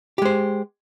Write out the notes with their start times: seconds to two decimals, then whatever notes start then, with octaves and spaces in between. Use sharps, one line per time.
0.18 G4
0.22 G#3
0.25 C5